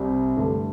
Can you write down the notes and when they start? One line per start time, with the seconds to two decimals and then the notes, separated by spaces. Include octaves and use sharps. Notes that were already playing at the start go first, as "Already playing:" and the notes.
Already playing: C2 C3 G3 C4
0.36 G2 D3 A3